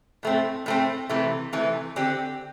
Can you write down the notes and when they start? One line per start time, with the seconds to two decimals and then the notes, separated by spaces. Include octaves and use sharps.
0.23 A2 A3 C4
0.66 A2 A3 C4
1.09 C3 E3 A3
1.53 C3 E3 A3
1.96 D3 C4 G4